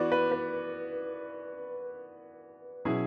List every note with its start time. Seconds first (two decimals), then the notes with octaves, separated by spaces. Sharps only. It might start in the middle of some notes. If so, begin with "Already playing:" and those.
Already playing: E3 B3 F#4 B4 D5
0.12 B4
0.32 B4
2.85 B2 F#3 C#4 E4 G#4